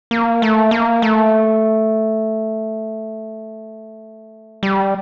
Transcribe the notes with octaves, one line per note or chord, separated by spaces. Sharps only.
A#3
A3
A#3
A3
G3